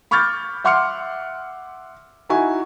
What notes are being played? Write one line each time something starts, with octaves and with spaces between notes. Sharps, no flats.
B5 C#6 D6 F6 G6 A6
E5 F#5 C6 D6 F6 C#7
D#4 E4 F#4 G#5